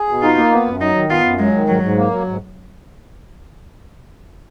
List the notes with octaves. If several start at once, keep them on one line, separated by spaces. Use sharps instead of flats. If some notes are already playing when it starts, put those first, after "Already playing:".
Already playing: G#4
B2
D#4 F4
A#3
B3
F#2
F#3 D#4
D#3
B3 F4
F#2
F#3 G#3
D#3
G#2 F#3
G#2
A#3
F#3
G#2